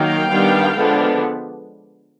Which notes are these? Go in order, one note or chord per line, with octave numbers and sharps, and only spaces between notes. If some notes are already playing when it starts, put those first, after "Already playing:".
Already playing: D#3 F#3 A#3 F5 G5
D#3 G3 B3 D4
D3 F3 G#3 B3 D4